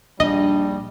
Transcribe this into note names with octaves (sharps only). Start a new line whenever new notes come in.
A#1 D#2 G3 D4 D#5